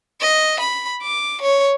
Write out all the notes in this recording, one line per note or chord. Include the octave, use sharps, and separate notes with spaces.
D#5
B5
D6
C#5